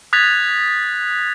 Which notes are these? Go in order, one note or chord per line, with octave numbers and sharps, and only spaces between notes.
D#6 F#6 G#6 A6 B6 F7